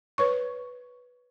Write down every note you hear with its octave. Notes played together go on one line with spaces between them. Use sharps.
B4 C#5 C#6